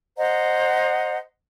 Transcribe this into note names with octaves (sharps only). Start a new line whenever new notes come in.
C5 D#5 F#5 A#5